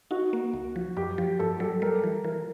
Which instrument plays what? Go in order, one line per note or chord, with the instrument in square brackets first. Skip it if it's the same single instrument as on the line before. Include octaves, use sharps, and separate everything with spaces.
[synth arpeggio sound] D#4 [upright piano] F#4
[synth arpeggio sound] A#3
C#2
F3
[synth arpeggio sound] F#2 [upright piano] G4
[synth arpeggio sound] F3
[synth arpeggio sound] G2 [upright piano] A4
[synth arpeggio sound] F#3 [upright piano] A4
[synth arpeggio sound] G3 [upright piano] A#4
[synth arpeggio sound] E3
[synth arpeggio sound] E3 [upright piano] A#4